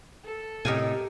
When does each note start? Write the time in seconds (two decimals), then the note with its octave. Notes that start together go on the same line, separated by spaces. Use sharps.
0.24 A4
0.65 A2 C3 G4 A#4 D#5 G#5